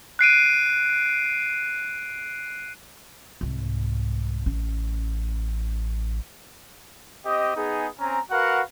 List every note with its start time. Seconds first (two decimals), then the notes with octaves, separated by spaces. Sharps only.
0.19 F#6 C7 D7 D#7
3.41 C2 G#2
4.46 A1 C#4
7.26 C4 G4 D#5
7.56 B3 D#4 G#4
7.99 C4 C#4 G#5 A#5
8.31 F#4 A#4 B4 F5 F#5